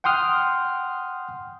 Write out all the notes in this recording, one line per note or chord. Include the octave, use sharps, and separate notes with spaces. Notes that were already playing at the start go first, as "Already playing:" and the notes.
F#5 G5 C6 D#6 F6